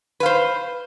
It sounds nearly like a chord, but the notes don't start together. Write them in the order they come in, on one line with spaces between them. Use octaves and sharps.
B4 F5 C5